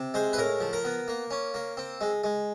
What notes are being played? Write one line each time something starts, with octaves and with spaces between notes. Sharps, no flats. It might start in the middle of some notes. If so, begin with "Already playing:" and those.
Already playing: C3
G#3 C5
B4
A2 A#4
F3
A#4
B3
A#3
C#4
A#3
C4
G#3
G#3